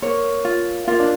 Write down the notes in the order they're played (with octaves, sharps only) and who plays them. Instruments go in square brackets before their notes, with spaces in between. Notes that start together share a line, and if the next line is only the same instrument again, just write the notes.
[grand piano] A#3 [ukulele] C#5
[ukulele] F4
[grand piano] A#3 [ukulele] F4
[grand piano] D4